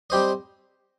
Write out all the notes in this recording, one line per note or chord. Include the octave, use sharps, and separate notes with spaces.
G3 C4 G4 C5 D#5